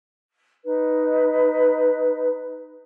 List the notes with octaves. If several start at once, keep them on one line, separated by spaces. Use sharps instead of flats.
D#4 B4